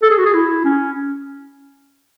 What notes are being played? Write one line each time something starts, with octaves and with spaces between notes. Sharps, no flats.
A4
G#4
F#4
G#4
E4
C#4